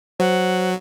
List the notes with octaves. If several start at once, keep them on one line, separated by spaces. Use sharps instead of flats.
F#3 C5 F#5